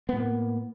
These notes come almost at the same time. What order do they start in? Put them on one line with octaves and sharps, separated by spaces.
B3 A2 A#3